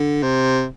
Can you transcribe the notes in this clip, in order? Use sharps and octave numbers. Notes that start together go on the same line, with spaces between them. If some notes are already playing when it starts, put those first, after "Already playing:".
Already playing: D3
C3